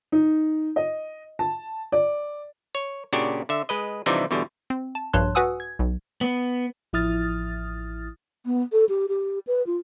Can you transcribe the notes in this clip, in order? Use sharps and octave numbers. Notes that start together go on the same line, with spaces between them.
D#4
D#5
A5
D5
C#5
A#2 C#3 D4 F#4 G4
D3 E5
G#3 B4 D#5
C3 E3 F3 G3 D4 D#4
E2 B2 D3 G3
C4
A5
A#1 G2 C#5 A5 C6 F#6
F#4 B4 F#5 G#5 D#6 E6
G#6
B1
B3
A1 F3 E4 D#6 F6 A6
B3
A4
G4
G4
B4
F4